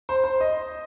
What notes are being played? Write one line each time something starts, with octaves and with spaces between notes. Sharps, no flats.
C5
C5
D#5